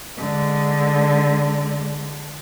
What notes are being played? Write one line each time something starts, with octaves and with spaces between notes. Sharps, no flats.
D3 G#3